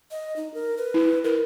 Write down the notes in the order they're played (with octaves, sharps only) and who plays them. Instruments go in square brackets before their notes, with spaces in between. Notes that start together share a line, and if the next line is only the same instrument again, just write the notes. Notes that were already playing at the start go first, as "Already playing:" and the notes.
[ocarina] D#5
D#4
A#4
B4
[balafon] E4
[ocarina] E4 [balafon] A#4